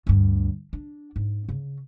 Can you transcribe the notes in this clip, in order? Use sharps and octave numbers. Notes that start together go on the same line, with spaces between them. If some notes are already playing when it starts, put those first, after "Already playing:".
D2 G2
D4
G#2
C#3